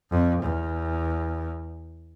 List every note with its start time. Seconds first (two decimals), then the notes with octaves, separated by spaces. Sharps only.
0.11 F2
0.42 E2